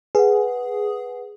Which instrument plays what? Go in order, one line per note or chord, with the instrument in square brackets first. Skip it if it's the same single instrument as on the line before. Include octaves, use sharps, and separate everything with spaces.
[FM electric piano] G#4 [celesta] B4 F#5